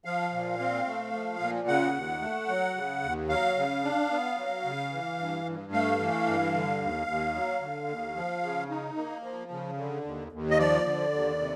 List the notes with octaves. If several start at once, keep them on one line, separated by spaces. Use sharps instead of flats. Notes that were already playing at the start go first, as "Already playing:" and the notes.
F3 F5
A#2
C4
A3
F3
A#2
C#3 F#5
D#2
A3
F#3
C#3
D#2
F#3 F5
C#3
D4
B3
F#3
C#3
E3
G2
G2
A3 F5
E3
G2
D3
D#2
D#2
F#3
D3
D#2
F3
C#3
D#4
A#3
F3
C#3
D3
D#2
D#2
D#5
F3 D5
D3
D#2
C3